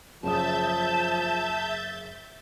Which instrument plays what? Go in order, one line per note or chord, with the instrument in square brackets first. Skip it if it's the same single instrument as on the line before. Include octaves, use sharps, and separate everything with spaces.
[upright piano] F#1 C#3 D#6 [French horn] F3 [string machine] E5 G6 A6 [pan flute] A5